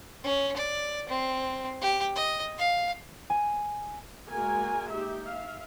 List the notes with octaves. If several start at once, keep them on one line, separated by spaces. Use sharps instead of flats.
C#4
D5
C4
G4
D#5
F5
G#5
G#3 A#3 F#4 A#4 G#5
D#4 G4 E5
E5 F5